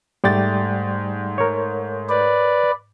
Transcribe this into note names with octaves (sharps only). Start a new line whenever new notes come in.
G#2 G3 A3 D5 G5 A6
A#4 C#5
B4 D5